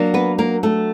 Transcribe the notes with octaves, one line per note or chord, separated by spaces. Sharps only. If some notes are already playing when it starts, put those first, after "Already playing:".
Already playing: F#3 A#3 D4
B3 B4
A#3 A#4
A3 A4